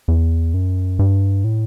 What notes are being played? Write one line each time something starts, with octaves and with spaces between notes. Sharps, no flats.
E2
F#2
G2
A2